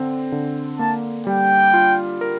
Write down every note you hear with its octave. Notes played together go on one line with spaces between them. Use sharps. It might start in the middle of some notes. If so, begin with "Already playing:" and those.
Already playing: D3 C4
D3
A#3 A5
G3 G5
F4
A#4